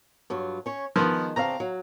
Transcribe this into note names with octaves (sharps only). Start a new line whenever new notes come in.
G2 F#3 F4
C#4 C#5
D#3 F3 G#3 B3
C#3 C4 D4 F5 A#5
F#3